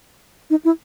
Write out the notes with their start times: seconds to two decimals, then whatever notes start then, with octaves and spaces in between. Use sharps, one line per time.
0.50 D#4
0.65 E4